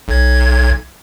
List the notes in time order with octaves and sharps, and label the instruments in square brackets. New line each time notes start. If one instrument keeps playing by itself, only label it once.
[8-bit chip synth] B1 G#6